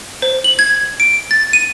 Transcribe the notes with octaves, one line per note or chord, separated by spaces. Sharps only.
C5
F#7
G#6
D7
A6
D#7